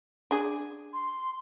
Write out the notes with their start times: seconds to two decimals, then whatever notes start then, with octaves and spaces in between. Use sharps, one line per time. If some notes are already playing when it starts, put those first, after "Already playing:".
0.31 D4 G#4
0.93 C6